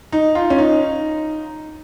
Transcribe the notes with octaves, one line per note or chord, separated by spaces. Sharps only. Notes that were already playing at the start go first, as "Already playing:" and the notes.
D#4
F4
C#4
D#4